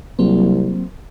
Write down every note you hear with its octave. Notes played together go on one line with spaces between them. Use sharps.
C2 F#3 A#3 C4